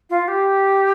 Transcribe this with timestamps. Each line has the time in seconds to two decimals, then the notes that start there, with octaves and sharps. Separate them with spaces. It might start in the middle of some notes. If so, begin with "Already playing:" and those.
0.09 F4
0.27 G4